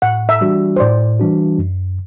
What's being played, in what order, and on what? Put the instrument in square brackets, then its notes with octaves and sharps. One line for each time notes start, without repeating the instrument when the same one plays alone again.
[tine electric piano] A2 [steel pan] F#5
[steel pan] E5
[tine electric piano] E3 G3 D4 F#4
[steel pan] C5
[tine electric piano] A2 [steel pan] D5
[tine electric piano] E3 G3 D4 F#4
F#2